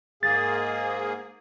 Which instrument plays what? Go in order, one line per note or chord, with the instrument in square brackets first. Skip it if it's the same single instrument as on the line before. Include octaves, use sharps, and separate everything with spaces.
[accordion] G#2 A#3 G#4 [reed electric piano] A6